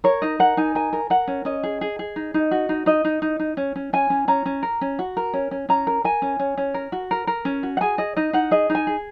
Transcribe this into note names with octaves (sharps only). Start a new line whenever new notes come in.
A#4 C#5
D#4 D#5
A#4 F#5
D#4 G#5
A#4 G#5
A#4
A#4 F#5
C#4
C#4 D#5
G#4
G#4
G#4
D#4
D#4
F#4
D#4
D#4 D#5
D#4
D#4
D#4
C#4
C#4
C#4 G#5
C#4
C#4 A#5
C#4
A#4
C#4
F#4
A#4
C#4
C#4
C#4 A#5
A#4
A#4 G#5
C#4
C#4
C#4
A#4
F#4
A#4
A#4
C#4
F#4
F#5
G#4 G#5
G#4 D#5
D#4 D#5
D#4 F#5
G#4 D#5
D#4
G#5
G#4